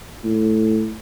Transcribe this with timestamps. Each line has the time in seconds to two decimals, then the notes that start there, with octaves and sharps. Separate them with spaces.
0.24 A2